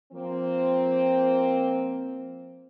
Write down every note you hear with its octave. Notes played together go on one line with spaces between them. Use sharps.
F3 A#3 C4